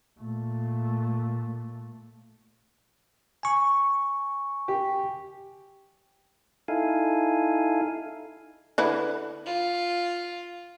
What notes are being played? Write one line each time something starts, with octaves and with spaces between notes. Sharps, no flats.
A#2 A3
G#5 C#6
G4
D#4 E4 A4 F5 G#5
D3 E4 B4
F4